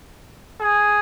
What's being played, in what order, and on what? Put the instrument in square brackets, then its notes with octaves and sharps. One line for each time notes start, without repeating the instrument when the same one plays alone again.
[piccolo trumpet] G#4